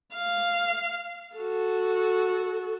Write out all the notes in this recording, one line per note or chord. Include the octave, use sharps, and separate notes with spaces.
F5
F#4 A4